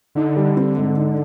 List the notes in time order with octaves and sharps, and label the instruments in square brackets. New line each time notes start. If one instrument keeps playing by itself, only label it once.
[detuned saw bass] D3 [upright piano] D#4
[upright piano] G3
C4
G#2
D#4